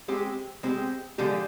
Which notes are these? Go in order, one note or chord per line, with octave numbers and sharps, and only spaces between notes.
G#3 C4 G4
G#3 C4 G4
D3 F3 G#3 D4 G4